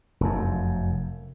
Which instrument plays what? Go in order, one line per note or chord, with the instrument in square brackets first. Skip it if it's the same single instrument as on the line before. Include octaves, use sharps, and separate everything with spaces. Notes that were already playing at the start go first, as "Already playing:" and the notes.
[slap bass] F1 F#2